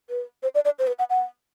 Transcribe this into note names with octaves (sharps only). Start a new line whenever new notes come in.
B4
C5
D5
D5
C5
B4
F#5
F#5